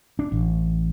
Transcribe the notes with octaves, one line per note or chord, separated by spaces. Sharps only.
D4
A1